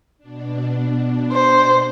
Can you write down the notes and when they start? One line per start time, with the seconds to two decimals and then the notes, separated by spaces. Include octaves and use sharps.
0.18 B2 D4
1.33 C5